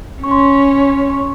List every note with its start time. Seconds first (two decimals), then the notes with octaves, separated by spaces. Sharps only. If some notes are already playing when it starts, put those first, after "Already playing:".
0.23 C#4 C#6
0.31 C6
0.39 C#6
1.10 C#6